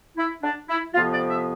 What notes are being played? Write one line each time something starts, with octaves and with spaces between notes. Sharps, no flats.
E4
D4
E4
F2 C3 F3 B3 F4
D5
E5